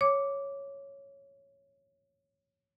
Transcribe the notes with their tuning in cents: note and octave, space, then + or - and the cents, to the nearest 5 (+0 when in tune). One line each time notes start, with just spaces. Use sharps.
C#5 +0 D6 -10